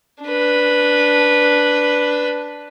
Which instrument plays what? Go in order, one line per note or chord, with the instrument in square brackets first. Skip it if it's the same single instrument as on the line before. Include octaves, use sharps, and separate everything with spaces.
[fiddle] D4 B4